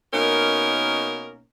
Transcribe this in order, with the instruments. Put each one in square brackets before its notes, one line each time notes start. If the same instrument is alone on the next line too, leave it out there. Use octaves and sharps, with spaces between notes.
[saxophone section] B2 A#3 C#4 D#4 A#4